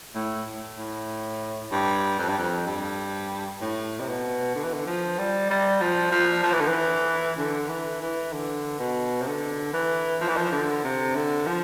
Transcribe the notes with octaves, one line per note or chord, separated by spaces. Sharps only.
A2
A2
G2
F2
G2
F2
G2
A2
C3
B2
D3
E3
D3
F3
G3
G3
F3
F3
F3
E3
D3
E3
D3
E3
E3
D3
B2
C3
D3
E3
F3
E3
F3
D3
C3
D3
F3